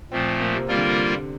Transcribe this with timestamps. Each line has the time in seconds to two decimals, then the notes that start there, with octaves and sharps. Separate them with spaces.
0.11 A#2 F3 A3 C4
0.40 A#3
0.54 C3
0.68 C3 G3 A#3 F4 A#4
0.76 D3
0.83 C3